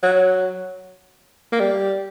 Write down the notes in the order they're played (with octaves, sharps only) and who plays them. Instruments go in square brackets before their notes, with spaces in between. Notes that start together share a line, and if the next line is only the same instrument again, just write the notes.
[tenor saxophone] F#3
A#3
G3